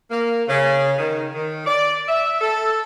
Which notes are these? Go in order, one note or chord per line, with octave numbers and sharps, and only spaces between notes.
A#3
C#3
D#3
D#3
D5
E5
A4